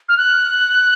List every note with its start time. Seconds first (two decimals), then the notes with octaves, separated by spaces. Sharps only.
0.09 F6
0.17 F#6